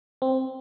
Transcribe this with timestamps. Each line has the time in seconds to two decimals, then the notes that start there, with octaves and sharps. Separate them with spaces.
0.22 C4